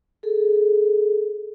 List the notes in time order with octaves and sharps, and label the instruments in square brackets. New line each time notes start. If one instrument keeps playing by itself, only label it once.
[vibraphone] G#4 A4